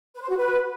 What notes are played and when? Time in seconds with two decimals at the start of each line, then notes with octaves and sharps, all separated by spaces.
0.15 B4
0.22 C5
0.30 F#4
0.37 B4